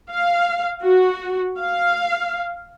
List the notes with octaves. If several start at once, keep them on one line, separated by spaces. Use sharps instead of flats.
F5
F#4
F5